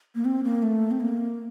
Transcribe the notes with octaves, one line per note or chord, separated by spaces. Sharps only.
A#3
C4
A#3
A3
C4
A#3